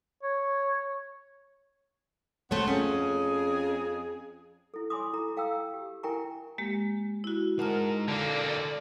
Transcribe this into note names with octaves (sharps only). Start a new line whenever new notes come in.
C#5
A3 B3 C4 C5 C#5
F2 C#4 G#4
E4 A4
C#5 G#5 B5 C6 D6 D#6
E4 A4 A#5
A4 F5 G5 A#5 E6
G4
E4 A#4 G5 G#5 A#5 C#6
G#3 A#3 G4
E4 F#4
G#3 D#4 A#4 F#5 A5 F6
D3 A#3 A4 D5